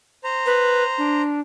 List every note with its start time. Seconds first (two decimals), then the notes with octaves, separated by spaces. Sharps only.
0.24 C5 A#5
0.46 B4
0.98 D4